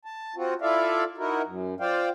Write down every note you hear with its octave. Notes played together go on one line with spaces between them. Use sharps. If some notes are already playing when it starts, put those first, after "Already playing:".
A5
C4 F4 F#4
E4 F4 A4 D5 E5 F5
D#4 E4 F#4 A#4
F#2
F4 C5 D5 F5 G5